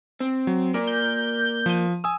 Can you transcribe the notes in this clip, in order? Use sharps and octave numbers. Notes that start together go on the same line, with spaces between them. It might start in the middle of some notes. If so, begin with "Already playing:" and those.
C4
F#3
A#3 A#4 D5
G6
F3 D#7
G#5 D#6 E6